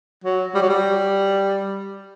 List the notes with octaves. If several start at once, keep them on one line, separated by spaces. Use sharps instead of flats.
F#3
G3
F#3
G3